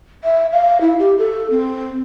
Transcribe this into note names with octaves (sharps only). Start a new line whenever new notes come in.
E5
F5
E4
G4
A4
C4